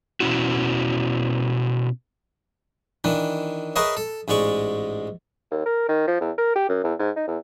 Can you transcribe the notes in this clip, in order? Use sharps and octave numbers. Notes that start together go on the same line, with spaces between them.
B2 C#4 E4 F#4
D#3 E3 D4
G#4 A#4 B4 C#5 D#5 E5
A4
A1 G#2 G#3 D5 C#6
D#2
A#4
D#3
F3
E2
A#4
G4
F#2
E2
G#2
D#4
E2